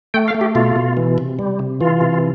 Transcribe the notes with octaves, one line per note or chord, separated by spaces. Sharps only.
A3 G5
F5
A3
G4
B2 F4
B2
E3
C3
G3
C3
E3 F4
C3